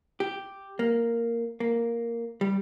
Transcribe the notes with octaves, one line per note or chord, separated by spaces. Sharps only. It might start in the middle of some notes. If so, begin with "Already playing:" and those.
G4
A#3
A#3
G3